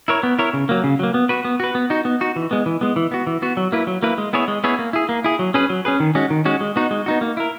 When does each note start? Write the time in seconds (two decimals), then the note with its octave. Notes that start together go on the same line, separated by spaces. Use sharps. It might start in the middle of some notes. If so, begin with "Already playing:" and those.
0.08 E4 A#4 C#5
0.23 B3
0.39 E4 A#4 C#5
0.54 C#3
0.69 F#3 A#3
0.84 C#3
0.99 F#3 A#3
1.14 B3
1.29 F#4 B4
1.45 B3
1.60 F#4 B4
1.75 B3
1.90 D#4 F#4
2.05 B3
2.21 D#4 F#4
2.36 E3
2.51 G#3 B3
2.66 E3
2.81 G#3 B3
2.96 E3
3.11 B3 F#4
3.27 E3
3.42 B3 F#4
3.57 F#3
3.72 A#3 E4 B4
3.87 F#3
4.03 A#3 E4 B4
4.18 G#3
4.33 B3 E4 G#4 C#5
4.48 G#3
4.64 B3 E4 G#4 C#5
4.79 A#3
4.93 E4 G#4
5.09 A#3
5.24 E4 G#4
5.39 F#3
5.54 C#4 G#4 B4
5.70 F#3
5.85 C#4 G#4 B4
6.00 D#3
6.15 G#3 C#4 F#4
6.30 D#3
6.45 G#3 C#4 F#4
6.61 G#3
6.76 B3 D#4 F#4
6.91 G#3
7.06 B3 D#4 F#4
7.21 A#3
7.37 E4 A#4